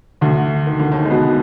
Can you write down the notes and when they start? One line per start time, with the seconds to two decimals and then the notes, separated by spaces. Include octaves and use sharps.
0.21 D2 D3
0.66 D#3
0.79 D3
0.92 D#2 D#3
1.05 G#3
1.10 B2 B3